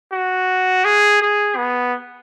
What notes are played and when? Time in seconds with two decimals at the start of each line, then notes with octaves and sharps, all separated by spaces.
0.12 F#4
0.85 G#4
1.22 G#4
1.57 B3